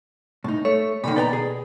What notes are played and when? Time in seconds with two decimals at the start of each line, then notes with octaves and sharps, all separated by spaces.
0.44 A2 D#4
0.65 A3 C#5
1.04 A#2 D3 D#3 B5
1.16 B2 D5 G5 A#5
1.33 G#4